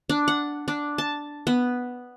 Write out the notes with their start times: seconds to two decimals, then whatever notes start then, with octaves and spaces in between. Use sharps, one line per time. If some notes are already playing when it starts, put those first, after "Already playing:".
0.09 D4
0.28 F#5
0.68 D4
0.98 A5
1.47 B3